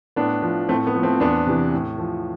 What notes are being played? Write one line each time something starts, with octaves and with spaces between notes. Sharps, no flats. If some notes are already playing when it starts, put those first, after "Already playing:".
A2 B3 D4
F3
A2 A3 C4
B3
F3
A3 C4
E2 B3 D4
C3 E3
A2
F3